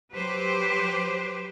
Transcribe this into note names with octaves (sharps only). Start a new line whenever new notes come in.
F#3 G4 B4 C5